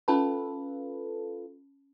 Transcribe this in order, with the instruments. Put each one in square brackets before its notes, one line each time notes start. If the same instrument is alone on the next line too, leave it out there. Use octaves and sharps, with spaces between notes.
[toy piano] C#4 A5 B5 [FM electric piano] F4 A4 B4